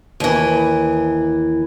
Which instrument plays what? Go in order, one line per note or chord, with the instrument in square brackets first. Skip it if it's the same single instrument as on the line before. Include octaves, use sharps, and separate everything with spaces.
[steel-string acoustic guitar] D#2 E3